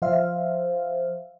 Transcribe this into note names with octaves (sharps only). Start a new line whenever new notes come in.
F3 C5 E5 F5